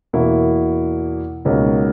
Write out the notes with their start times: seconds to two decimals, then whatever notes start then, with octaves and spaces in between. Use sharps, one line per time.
0.13 E2 B2 A#3 E4
1.45 C#2 B2 A#3 D#4